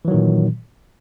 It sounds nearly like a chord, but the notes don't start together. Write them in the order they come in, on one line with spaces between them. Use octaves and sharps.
E3 F#3 D#3 A#2